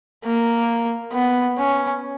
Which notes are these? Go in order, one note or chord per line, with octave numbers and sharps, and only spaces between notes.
A#3
B3
C#4